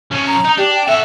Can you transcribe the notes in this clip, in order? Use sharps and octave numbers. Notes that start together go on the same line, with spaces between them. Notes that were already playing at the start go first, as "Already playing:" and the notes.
F3 C#4
A#5
D#4
D4 G4
G5
F#4 A4 E5